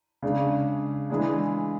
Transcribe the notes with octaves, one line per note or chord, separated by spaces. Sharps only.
C#3 G#3 D4
E3 G#3 D4 G#4